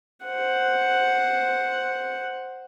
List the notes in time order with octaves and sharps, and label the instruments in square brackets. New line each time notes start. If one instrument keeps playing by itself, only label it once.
[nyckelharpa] C5 F#5